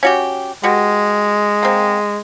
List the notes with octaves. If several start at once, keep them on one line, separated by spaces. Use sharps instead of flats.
C#4 F#4 G4
B2 G#3 F#4 G4
A#3 C4